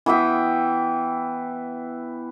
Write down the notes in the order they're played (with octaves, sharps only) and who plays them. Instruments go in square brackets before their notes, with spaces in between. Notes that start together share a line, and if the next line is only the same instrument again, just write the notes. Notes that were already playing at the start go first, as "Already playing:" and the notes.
[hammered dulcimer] E3 B3 E5 G5